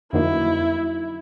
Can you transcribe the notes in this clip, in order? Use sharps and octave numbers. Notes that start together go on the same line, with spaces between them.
F2 D3 F#3 A#3 D#4 E4